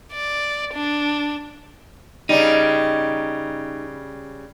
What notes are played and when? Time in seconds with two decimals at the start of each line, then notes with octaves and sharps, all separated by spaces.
0.13 D5
0.74 D4
2.29 C#3 G3 D#4